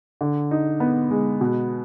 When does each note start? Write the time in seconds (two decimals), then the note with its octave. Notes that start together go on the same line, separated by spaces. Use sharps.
0.21 D3
0.51 D#4
0.80 B3
1.11 G#3
1.41 B2